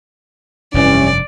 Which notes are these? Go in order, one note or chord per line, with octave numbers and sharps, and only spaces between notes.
F1 G2 C3 E3 G3 C#4 D5